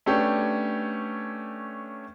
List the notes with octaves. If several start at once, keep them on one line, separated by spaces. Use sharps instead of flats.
A3 B3 C#4 D4 G4